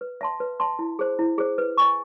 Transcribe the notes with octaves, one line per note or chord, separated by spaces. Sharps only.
B4
E5 A5 C6
B4
E5 A5 C6
E4
G#4 C5
E4
G#4 C5
B4
D#5 G#5 C#6